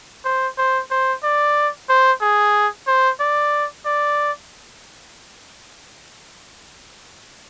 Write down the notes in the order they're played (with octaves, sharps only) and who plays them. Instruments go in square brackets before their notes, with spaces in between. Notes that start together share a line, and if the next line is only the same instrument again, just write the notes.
[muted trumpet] C5
C5
C5
D5
C5
G#4
C5
D5
D5